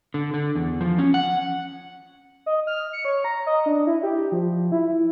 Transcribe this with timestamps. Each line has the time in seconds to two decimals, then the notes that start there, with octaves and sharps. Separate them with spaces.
0.14 D3
0.34 D3
0.55 E2
0.81 F3
0.98 C#4
1.14 F#5
2.46 D#5
2.67 F6
2.93 C#7
3.05 C#5
3.24 A#5
3.47 D#5
3.66 D4
3.87 E4
4.03 G4
4.32 F3
4.72 E4